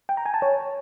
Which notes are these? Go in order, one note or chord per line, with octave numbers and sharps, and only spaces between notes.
G5
A#5
G#5
A5
C#5